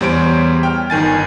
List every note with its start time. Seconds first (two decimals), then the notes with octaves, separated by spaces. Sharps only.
0.01 E2 G3 C5 C#5 D7
0.63 G5 F6
0.90 G1 D#3 G#5 A6